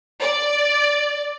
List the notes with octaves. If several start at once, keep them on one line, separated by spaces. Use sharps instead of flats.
D5